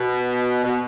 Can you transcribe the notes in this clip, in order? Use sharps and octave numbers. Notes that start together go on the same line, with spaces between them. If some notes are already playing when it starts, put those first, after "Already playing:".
Already playing: B2
B2